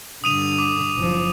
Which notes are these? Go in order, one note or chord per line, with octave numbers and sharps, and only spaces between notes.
G2 D3 D#6 D#7 F7
D6
F#1 F3